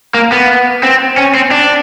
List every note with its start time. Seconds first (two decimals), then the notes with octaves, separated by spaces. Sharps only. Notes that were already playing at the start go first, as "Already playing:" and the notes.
0.14 A#3
0.32 B3
0.83 C4
1.18 C#4
1.35 C4
1.51 D4